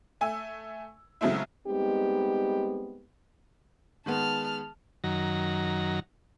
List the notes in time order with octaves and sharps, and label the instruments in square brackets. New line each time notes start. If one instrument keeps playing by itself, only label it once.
[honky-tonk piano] A3 G#5 E6
C#3 F#3 G#3 A3 C4 E4
[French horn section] G3 G#3 B3 C4 D#4 G4
[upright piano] D#3 G#3 B3 [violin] A5 F6
[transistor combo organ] F#2 D#3 F#3 A#5